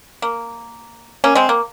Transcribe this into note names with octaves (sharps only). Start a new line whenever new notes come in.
A#3
A#3 C#4
G#3 C4
A#3